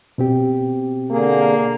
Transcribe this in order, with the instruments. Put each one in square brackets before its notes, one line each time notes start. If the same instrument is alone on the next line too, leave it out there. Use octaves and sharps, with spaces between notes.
[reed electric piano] B2 C4 G4
[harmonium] D3 G#4 [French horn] A#3